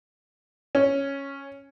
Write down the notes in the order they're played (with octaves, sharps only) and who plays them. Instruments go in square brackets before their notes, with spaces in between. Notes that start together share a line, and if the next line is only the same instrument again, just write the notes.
[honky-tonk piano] C#4